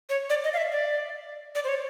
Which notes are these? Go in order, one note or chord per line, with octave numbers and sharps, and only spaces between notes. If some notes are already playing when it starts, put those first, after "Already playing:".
C#5
D5
D#5
F5
E5
D5
D5
C5
C#5